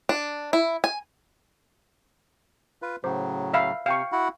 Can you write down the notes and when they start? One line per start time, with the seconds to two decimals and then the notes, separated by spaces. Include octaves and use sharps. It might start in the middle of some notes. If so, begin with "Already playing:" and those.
0.09 D4
0.53 E4
0.84 G#5
2.82 F4 B4
3.04 A2 C#3 F#3 C5
3.54 E5 F5 B5
3.86 C3 F5 G5 C#6
4.12 E4 F#4 F#5